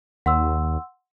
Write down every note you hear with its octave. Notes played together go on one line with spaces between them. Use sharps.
D#2 F#5 C6 E6